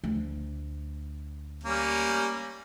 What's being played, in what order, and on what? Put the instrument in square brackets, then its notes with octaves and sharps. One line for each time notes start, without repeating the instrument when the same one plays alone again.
[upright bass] D2
[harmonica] G3 A#3 C#4